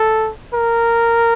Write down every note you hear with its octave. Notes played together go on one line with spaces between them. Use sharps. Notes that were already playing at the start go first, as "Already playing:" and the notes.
Already playing: A4
A#4